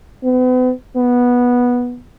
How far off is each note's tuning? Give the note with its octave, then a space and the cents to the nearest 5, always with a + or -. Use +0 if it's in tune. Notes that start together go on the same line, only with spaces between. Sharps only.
B3 +40
B3 -10